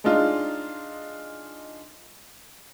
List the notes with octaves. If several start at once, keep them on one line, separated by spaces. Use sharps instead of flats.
G#3 D4 D#4 F4